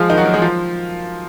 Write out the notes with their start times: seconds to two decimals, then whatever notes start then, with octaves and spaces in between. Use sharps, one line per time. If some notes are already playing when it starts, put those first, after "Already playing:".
Already playing: F3 G#3 F4 G#4
0.10 D#3 D#4
0.18 F#3 F#4
0.26 A#3 A#4
0.34 G#3 G#4
0.42 F3 F4